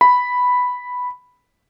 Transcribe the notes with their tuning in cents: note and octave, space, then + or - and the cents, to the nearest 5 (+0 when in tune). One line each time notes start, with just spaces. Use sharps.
B5 +0